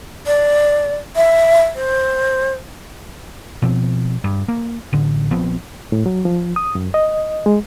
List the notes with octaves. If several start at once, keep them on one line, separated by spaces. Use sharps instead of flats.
D5
E5
C5
B2 F3 C4
G2
A#3
A1 D3
A#1 F3 B3 C4
A2
F#3
F3
D#6
F#2
D#5
G#3